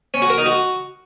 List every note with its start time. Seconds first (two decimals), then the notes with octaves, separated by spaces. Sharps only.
0.14 C#4
0.22 F#4
0.30 A#4
0.38 D#4
0.46 F#4